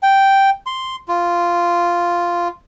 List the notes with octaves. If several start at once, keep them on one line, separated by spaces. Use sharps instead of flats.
G5
C6
F4